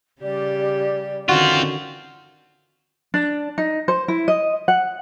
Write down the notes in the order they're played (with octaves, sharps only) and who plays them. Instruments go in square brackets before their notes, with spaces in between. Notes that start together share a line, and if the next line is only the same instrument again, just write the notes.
[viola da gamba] C#3 G3 G4 [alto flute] D5
[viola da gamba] D3 D#3 C#4 [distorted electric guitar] C4 F4 [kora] F#4
[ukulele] D4
D#4
C5
E4
D#5
F#5